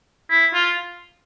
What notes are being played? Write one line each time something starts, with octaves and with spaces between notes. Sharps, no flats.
E4
F4